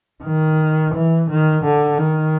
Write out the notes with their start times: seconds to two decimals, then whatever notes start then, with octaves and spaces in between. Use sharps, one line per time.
0.24 D#3
0.95 E3
1.30 D#3
1.65 D3
1.98 D#3